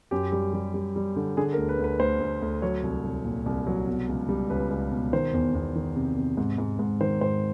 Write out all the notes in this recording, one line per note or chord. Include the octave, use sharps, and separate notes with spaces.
F#2 G4
G3
G3
G3
G3
D3
D3 G#4
A#4
D2
B4
D2
B4
D2 C5
D2
D2
F#3 C#5
C2
C2
A#2
C2
F#3
B2
C#2
G3
C#2 B4
C#2
B2
D#3 C5
E2
E2
D#3
C3
C3
G#2
G#2
G#2
D#3 C5
G#2 C5